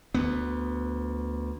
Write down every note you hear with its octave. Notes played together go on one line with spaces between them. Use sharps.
D2 B3